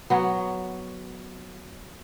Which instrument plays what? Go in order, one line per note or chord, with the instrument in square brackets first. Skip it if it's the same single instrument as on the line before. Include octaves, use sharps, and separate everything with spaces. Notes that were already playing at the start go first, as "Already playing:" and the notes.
[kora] F#3 B3 F#4